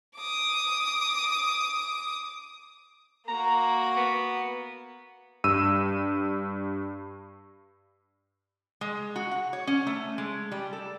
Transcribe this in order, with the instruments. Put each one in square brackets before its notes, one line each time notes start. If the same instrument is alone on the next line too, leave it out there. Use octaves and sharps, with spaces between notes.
[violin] D6 D#6
[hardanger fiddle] A#3 F#4 [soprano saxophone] A#5
[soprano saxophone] B3
[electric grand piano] G2 E6 D#7
[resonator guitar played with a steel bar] G#3
F#4
F#5
C#5
C#4
A3
G#3
G3
A4